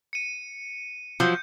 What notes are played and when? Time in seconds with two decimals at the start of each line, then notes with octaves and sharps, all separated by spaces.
0.13 C#7 D#7
1.20 F3 F#3 G6